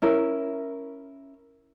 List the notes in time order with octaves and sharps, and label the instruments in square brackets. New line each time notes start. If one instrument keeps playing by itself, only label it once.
[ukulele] C#4 E4 A#4